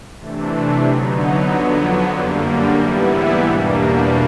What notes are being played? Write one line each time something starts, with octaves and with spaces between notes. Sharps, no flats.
C3 E3 A3 D4
D3 F#3 B3 D#4
F2 D3 F#3 B3
F#2 D3 G3 A#3
G#2 E3 G3 B3 E4
E2 B2 G3 A#3 D4